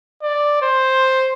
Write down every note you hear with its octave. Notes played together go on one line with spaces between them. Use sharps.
D5
C5